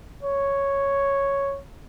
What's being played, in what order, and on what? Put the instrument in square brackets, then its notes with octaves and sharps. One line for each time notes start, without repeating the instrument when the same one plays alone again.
[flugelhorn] C#5